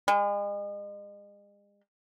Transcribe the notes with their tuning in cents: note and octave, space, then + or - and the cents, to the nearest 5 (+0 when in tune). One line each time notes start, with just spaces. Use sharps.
G#3 -40